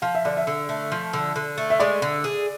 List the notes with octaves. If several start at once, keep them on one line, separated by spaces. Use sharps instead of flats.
F3 F5
E5
D3 D5
E5
D3
A3
F3
D3
D3
A3
E5
G#3 D5
D3
G#4